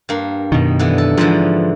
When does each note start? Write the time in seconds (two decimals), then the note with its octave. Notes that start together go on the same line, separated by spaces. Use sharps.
0.09 G2 A#3
0.52 F#2 B2 D#3
0.79 D3 E3 B3
0.98 A4
1.17 G#2 D3 E3 F3